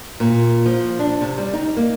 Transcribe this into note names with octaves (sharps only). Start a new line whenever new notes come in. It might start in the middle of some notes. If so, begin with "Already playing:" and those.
A#2
F3
D4
C3
G3
D#4
A#3